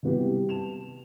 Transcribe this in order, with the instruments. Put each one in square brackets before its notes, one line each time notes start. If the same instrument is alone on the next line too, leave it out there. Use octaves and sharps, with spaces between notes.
[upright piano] C3 G3 B3 E4 G4
A5 E7 F7